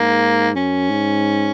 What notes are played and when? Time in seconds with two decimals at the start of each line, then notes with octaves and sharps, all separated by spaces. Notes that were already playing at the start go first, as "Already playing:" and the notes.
Already playing: G#2 A#3
0.56 F#2 C#4
0.91 G#2